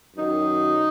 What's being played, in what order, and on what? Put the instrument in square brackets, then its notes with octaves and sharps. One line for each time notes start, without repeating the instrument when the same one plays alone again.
[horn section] F#2 D#3 F#3 D#4